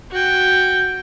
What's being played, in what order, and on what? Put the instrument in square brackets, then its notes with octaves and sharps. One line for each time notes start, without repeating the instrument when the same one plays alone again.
[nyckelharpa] F#4 G5